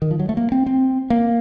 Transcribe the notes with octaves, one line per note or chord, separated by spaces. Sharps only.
D#3
F3
F#3
A3
A#3
C4
C4
A#3